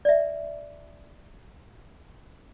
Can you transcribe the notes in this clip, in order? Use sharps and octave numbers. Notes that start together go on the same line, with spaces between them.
D5 E5